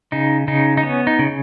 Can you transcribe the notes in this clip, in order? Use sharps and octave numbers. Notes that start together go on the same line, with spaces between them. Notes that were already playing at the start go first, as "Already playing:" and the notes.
C#3 D#4
C#3 D#4
D#4
B3 C#4
D#4
C#3